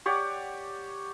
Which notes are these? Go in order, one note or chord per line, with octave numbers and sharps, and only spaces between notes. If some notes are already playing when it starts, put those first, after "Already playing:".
G4 C#5 D5 F#5